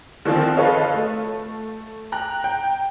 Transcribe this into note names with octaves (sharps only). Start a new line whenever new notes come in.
D3 D#3 F3 C4
F4 A4 B4 C#5 D#5 F5
A3
G5 A#5 F#6
G5